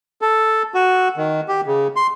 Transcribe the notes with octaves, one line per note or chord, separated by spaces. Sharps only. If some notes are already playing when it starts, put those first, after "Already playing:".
A4
F#4
D#3
G4
C#3
C6